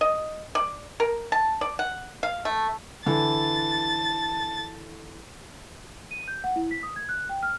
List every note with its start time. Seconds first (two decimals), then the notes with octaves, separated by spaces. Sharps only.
0.01 D#5
0.55 D5
1.00 A#4
1.32 A5
1.61 D5
1.79 F#5
2.23 F5
2.45 A3
3.06 D3 E3 A5 A6
6.11 D#7
6.28 G6
6.44 F#5
6.56 E4
6.71 B6
6.83 D#6
6.96 G#6
7.09 F#6
7.29 G5
7.43 F6